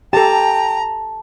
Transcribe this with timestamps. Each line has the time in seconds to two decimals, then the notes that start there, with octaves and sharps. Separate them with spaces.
0.13 G4 A4 G5 A5 A#5